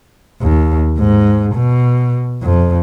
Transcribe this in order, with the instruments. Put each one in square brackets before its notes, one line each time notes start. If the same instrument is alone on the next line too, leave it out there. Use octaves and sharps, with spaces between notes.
[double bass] D#2
G#2
B2
F2